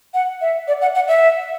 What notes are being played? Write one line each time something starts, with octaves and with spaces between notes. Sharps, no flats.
F#5
E5
D5
F#5
F#5
E5